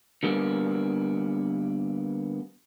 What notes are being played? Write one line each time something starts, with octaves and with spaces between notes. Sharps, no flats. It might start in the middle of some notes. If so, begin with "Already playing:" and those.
D3 G3 A#3 B3